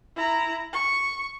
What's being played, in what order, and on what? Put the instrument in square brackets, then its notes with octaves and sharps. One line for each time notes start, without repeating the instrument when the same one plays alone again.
[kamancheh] E4 A#5
C#6